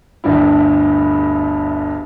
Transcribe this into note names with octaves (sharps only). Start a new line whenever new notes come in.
G1 D2 G2 G3 E4